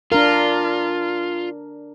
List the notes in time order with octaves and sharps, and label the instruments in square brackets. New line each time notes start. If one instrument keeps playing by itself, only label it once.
[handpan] D4 A#4 [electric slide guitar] F4